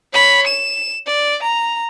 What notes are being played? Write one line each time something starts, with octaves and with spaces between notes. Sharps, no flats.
C#5 B5
E7
D5
A#5